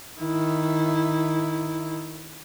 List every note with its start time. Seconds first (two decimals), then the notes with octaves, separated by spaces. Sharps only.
0.20 D#3 E4